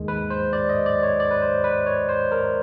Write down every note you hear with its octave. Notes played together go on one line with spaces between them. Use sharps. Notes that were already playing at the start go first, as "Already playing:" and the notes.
Already playing: D#2 D#3 G#3
B4
C5
D5
D#5
D5
C#5
D5
B4
C5
B4
C#5
C5
A#4